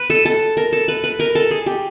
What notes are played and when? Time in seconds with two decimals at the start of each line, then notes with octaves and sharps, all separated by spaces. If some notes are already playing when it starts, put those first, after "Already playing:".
Already playing: B4
0.10 A4
0.25 A4
0.57 A#4
0.72 A4
0.88 B4
1.04 B4
1.19 A#4
1.35 A4
1.51 G#4
1.66 G4